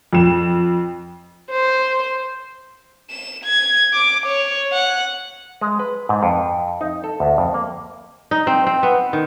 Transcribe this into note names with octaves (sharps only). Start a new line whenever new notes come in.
F2 E7
C5
E7
G#6
D6
C#5
F#5
G#3
B4
G#2
F2
D#4
A4
D2
F2
A#3
D#4
C4
C4
B3
D#3